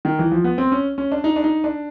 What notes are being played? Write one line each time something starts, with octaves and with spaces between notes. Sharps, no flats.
D#3
E3
F3
B3
C4
C#4
C#4
D4
D#4
D4
D#4
D4